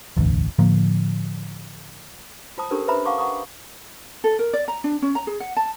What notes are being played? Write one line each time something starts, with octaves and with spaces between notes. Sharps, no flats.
E1 A1 D2
A2 D3 F3 A#3
F4 C5 A5 D#6
C#4 D4 G4 A4 A#4 C5
B4 C5 E5 A#5 B5
F5 F#5 A5 C#6 D6
F#5 A#5 C#6 D#6
A4
A#4
D5
A#5
D4
C#4
A#5
G#4
F#5
A5